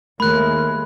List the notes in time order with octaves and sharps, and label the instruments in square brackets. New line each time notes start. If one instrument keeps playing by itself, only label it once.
[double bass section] D#2 G#3 [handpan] D#3 A3 [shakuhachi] A#4 [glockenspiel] B5 F#6